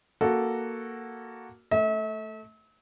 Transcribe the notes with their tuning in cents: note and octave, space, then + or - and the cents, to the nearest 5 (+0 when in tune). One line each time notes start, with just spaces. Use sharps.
A#3 +0 F#4 +0 A4 +0
A3 +0 E5 -40